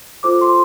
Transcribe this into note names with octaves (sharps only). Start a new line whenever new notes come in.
F4 A4 C5 D6
C6